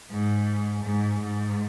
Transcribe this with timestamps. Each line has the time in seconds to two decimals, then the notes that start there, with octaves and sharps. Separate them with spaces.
0.11 G#2
0.84 G#2
1.20 G#2